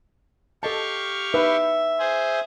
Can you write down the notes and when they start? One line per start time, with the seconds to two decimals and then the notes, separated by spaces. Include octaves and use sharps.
0.63 G4 A4 D#5 F5 A5 C#6
1.34 D#4 B4 E5 E6
1.99 G#4 C5